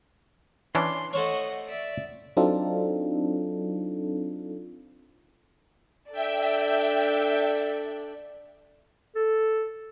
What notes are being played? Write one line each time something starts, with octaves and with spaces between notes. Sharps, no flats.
E3 C#4 D4 C6
A3 C5 C#5 D#5 F#5
D5 E5
F#3 C4 D4 D#4 F4 A4
D4 A4 D5 E5 G5
A4